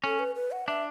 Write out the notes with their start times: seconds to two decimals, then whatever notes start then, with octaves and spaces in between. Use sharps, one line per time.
0.04 C#4 A4
0.19 B4
0.35 B4
0.51 F#5
0.67 D4 E5